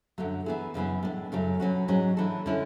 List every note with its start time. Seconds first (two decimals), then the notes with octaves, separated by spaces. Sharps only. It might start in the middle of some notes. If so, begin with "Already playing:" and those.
0.18 F#2 D3 F#3 A3
0.46 E3 B3 E4 G#4
0.74 F#2 C#3 E3 B3
1.03 A2 G#3 D4
1.32 F#2 C#3 F#3 A3
1.60 B2 F#3 C#4 F#4
1.88 G#2 F#3 C#4 G#4
2.17 E3 A3 D4 A4
2.46 D3 G#3 C#4 E4